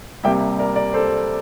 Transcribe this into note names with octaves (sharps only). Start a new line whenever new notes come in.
C2 C3 G3 A#3 E5 G5
A#4 D5
A#4 D5
A4 C5